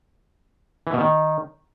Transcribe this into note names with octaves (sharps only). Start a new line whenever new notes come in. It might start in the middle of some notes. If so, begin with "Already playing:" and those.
E3
B2
D#3